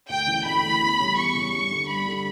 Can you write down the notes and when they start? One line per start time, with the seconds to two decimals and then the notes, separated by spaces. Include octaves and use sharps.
0.08 D2 G5
0.27 C#3 E3
0.45 D2 B5
0.63 C#3 E3
0.81 E2
0.99 C#3 G3 C#4
1.17 E2 C#6
1.35 C#3 G3 C#4
1.53 G2
1.71 D3 G3
1.88 G2 B5
2.07 D3 G3